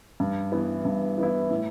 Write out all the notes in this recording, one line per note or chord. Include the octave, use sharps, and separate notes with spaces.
G2
E3 B3 E4
G2
E3 B3 E4
A2